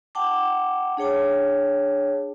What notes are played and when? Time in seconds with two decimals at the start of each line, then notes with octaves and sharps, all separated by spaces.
0.15 F#5 G5 A5 D6
0.97 D4 G#4 C#5 G5 A5